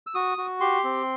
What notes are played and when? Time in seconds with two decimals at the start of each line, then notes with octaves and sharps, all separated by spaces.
0.07 E6
0.15 F#4 D#6
0.38 F#4
0.61 G4 C6
0.84 C4